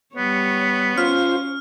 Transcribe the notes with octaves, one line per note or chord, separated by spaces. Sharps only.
G3 B3 C#5
C#4 F4 C5 F6